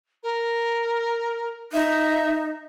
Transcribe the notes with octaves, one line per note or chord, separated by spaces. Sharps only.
A#4
D#4 E5